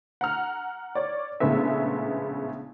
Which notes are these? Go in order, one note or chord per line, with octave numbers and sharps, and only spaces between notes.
F#5 A#5 F6
C#5 D5
A#1 A2 C#3 G#3 B3 E5